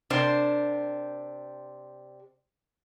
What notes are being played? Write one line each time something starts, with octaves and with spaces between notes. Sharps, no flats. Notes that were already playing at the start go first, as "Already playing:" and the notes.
C3 D4 A#4 C5